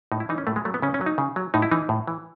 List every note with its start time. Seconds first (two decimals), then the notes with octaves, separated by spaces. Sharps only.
0.12 A2 D#4
0.20 E4
0.29 E3 D#4
0.38 C#4
0.47 A2 A3
0.56 G#3
0.65 F#3 A3
0.74 B3
0.82 C#3 C#4
0.94 C#4
1.01 F#3
1.06 D#4
1.18 C#3
1.36 F#3
1.54 A2 D#4
1.62 E4
1.71 E3 D#4
1.89 A2
2.08 E3